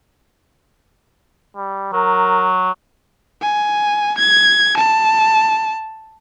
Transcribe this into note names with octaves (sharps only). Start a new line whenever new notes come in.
G3
F#3 A#4
G#5
G#6
A5